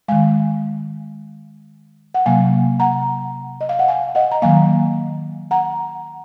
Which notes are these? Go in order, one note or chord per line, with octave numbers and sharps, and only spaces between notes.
D#3 G#3 F5 G#5
F#5
C3 F#3 A#3 F5 G#5
F#5 A#5
D#5
F5
F#5
F5 G#5
D#5 F#5
A#5
D#3 F#3 A#3 F5 G#5
F#5 A#5